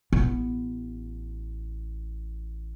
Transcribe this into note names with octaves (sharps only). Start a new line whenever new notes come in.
A1 B3